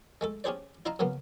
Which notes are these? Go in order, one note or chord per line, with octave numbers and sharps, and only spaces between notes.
G#3 A3 A4
C#4 D4 G4 G#4 C5 D5
E4 F4 D#5 F5 A5 A#5
F#2 C#3 A#3 B3